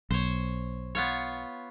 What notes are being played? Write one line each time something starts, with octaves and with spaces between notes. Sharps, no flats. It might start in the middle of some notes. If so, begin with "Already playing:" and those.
B1 C5 C#5
B3 F4 C#5